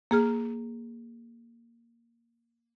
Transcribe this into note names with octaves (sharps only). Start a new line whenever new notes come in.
A#3 G#4 F6